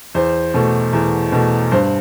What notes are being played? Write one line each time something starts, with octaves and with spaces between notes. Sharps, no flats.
E2 C5
B2 A3
E2
B2 A3
G2 C5